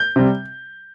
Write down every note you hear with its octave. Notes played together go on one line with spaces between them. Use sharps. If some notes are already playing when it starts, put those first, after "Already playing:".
Already playing: G6
C3 G3